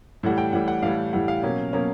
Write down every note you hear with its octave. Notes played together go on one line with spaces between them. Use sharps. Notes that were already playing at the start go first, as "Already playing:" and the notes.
A2 E3 G3 F#5
G5
A2 E3 G3 F#5
F#5
A2 E3 G3 F5
A2 E3 G3 F#5
F5
B2 F#3 A#3 C#4
B2 F#3 A#3 C#4